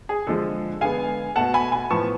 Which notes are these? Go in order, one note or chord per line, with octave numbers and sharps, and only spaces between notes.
G#4
D3 F3 G#3 A4
D3 G#3 B3 F5 G#5
B2 A3 F#5 A5
G#5 B5
G#5 B5
A2 F3 B3 A5 C#6